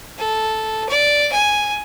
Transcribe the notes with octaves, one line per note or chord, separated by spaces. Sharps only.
A4
D5
G#5